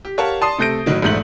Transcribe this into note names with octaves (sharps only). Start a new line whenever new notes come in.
G4
G4 A#4 C#5 F5 F#5 A5
D5 A5 C6 D#6 C7
C3 A3 A4 G6 A#6 D7
G#1 A2 D#3 F#3
A#1 E2 G#2 A3 G6 F#7